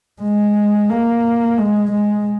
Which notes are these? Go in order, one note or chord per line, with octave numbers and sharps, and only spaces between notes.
G#3
A#3
G#3
G#3